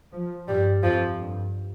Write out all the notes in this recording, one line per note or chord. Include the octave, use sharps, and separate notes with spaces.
F3
G2 G3
F2 F3
G2